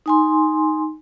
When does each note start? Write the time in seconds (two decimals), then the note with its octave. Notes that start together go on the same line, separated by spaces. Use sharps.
0.06 D#4 G#5 C6